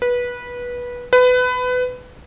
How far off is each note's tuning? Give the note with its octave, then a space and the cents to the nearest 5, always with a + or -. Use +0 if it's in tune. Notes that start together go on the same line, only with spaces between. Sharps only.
B4 -20
B4 +20